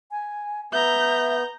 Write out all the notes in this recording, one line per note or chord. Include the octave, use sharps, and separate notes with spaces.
G#5
B3 E5 A#5 G6